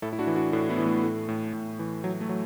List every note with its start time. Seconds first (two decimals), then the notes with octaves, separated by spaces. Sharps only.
0.02 A2 E4 A4
0.13 E4
0.19 D4 F#4
0.27 E3
0.36 D4 F#4
0.53 A2 D4 F#4
0.69 B3 E4
0.78 E3
0.86 A3
1.03 A2
1.29 A2
1.53 A2
1.79 E3
2.04 F#3
2.21 A3
2.29 F#3